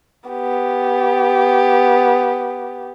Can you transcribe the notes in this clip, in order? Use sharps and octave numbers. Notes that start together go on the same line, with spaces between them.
B3 G4